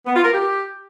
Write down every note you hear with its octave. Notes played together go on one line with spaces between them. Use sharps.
B3
F4
A#4
G4